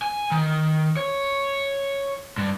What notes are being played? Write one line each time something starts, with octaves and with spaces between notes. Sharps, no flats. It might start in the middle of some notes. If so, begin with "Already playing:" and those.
G#5
D#3
C#5
G2